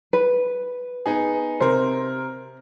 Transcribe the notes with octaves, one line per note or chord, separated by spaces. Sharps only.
B4
B3 D#4 G#4
C3 A#4 C5